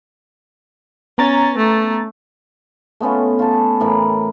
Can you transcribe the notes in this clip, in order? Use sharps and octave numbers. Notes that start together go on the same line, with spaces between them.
B3 C#4 A#5 A6
A3
A3 B3 C#4 F4
F4 A5
A2 E3 A#4 B5